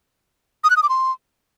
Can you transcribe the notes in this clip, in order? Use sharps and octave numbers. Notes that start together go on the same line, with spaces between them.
D#6
F#6
D#6
D6
C6